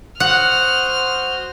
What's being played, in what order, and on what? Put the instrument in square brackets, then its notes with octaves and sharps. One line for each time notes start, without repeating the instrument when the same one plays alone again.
[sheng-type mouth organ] F#4 C5 D#6 [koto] F#5 [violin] F6